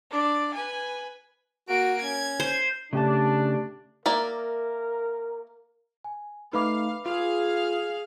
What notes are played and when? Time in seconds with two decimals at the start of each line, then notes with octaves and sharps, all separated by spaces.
0.11 D4 D5
0.54 B4 G#5
1.69 A#3 F#4 D7
2.02 C#4 G#6
2.40 C5
2.93 C#3 A3 D4 G4 A5
4.06 A#3 A#4 D5 E5
6.04 G#5
6.53 A3 D#4 B4 F5 B5 D6
7.06 F4 G#4 F5